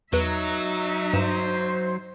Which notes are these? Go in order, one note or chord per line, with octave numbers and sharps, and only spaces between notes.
E2 F#3 D#4 B4 E5
G2 C5 E7